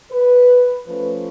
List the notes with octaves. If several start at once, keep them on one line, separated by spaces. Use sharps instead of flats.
B4
F3 A3 C#4 B4